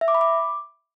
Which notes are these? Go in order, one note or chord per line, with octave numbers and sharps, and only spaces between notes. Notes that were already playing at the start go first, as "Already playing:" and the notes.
E5
D6
B5
D6